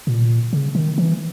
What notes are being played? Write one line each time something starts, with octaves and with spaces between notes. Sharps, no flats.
A#2
C#3
D#3
E3